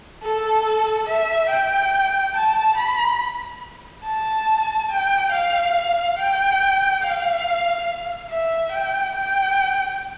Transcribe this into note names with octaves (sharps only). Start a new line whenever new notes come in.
A4
E5
G5
A5
B5
A5
G5
F5
G5
F5
E5
G5
G5